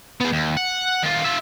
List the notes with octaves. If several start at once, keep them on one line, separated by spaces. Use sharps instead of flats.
B3 G#4
D#2
F#5
D#3 F4
F4 E5